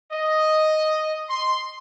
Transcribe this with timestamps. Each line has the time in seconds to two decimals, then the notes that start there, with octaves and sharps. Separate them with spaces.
0.12 D#5
1.28 C6